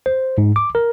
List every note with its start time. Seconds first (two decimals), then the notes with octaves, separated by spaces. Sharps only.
0.06 C5
0.38 G#2
0.56 D6
0.75 A#4